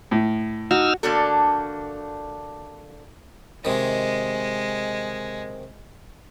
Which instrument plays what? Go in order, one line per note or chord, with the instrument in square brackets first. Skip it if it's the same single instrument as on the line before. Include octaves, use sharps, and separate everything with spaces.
[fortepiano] A2
[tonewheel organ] D#4 E6 F6 [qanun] F#4
[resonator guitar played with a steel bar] D3 A3 A#3 D4 F#4 A4
[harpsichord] C3 D#3 [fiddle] G#3